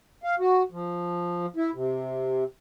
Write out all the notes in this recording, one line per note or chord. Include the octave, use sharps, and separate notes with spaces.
F5
F#4
F3
E4
C3